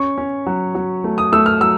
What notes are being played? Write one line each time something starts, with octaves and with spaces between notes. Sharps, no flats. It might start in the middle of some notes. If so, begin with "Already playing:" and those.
Already playing: C#4 C#6
C#4
F#3
F#3
A3
D#6
A3 E6
F6
F#3 E6